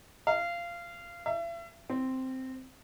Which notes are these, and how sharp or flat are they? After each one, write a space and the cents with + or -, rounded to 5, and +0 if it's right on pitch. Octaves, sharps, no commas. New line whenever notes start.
F5 -20
E5 +40
C4 -5